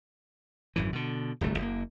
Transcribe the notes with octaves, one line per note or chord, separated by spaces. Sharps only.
G#1 F#2 E3
B2 D3
D1 G1 C2 A3
F#1 D#3 A#3